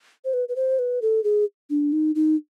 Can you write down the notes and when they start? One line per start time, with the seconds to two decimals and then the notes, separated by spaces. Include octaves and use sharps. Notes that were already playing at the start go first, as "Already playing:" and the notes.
0.25 C5
0.34 B4
0.49 B4
0.56 C5
0.79 B4
1.02 A4
1.24 G#4
1.70 D4
1.92 D#4
2.15 D#4